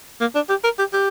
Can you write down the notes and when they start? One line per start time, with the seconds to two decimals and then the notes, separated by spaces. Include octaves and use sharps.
0.21 A#3
0.35 D4
0.49 G4
0.64 A#4
0.79 G4
0.93 G4